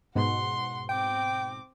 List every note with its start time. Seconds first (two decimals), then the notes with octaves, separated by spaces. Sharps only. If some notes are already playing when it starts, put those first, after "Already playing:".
0.15 G#2 B2 F#5 C6
0.89 C4 G5 D6